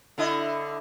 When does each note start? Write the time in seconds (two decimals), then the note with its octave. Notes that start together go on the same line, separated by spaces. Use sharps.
0.18 D3 E4 D#5